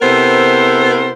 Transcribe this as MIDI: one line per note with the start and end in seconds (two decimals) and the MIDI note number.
0.02 1.13 48
0.02 1.13 59
0.02 1.13 64
0.02 1.13 69
0.02 1.13 70
0.02 1.13 72